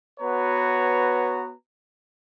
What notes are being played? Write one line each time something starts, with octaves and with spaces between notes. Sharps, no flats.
B3 F#4 B4 C#5 A#5